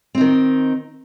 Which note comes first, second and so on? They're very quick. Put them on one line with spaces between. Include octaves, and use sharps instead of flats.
C4 D#4 D#3